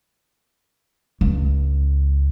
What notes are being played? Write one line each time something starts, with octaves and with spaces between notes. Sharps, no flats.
C#2